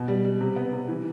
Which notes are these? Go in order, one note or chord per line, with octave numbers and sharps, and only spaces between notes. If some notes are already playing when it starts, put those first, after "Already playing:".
Already playing: B2
G3
G3
C3
B3
C3
E3